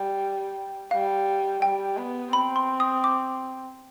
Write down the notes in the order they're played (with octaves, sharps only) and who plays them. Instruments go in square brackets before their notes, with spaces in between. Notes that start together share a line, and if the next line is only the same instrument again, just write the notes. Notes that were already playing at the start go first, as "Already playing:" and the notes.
Already playing: [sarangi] G3
[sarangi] G3 [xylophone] F5
[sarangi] G3 [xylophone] G5
[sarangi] B3
[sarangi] C4 [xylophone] B5
[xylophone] C6
D#6
D6